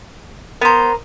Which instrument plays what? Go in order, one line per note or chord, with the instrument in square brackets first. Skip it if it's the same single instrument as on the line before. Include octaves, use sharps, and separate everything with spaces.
[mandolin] B3 C5 [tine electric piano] A#4 A#5